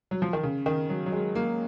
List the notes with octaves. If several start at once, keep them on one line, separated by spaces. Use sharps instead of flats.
F#3
F3
D#3
C#3
D#3
F#3
F#3
G#3
A#3